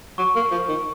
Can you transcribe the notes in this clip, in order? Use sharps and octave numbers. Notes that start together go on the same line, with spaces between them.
F#3 C#6
A#3
F3
D#3